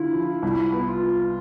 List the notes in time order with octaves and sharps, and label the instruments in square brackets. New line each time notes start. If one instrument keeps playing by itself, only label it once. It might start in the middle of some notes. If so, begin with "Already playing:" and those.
Already playing: [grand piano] D3 F4 [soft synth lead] E4
[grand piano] F3
[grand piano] C2 [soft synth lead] E4
[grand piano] B3
[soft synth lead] F4